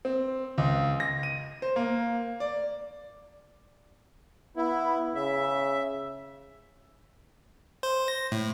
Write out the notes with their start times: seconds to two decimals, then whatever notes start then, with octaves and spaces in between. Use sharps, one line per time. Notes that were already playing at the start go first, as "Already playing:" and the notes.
0.05 C4
0.58 C#2
1.00 A#6
1.23 D#7
1.62 C5
1.76 A#3
2.40 D5
4.57 B3 E4
5.15 C#3 E5
7.83 C5
8.08 A#6
8.32 A2